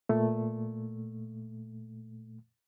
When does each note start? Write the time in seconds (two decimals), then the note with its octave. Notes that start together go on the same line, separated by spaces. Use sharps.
0.09 A#2 A3